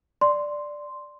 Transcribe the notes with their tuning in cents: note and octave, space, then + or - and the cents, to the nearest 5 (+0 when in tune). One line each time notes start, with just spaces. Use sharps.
D5 +5 C6 +0